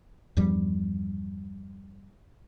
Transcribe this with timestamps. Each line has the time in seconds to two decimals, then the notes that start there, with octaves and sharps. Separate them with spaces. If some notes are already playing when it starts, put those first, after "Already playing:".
0.37 E2 G2 F3 G3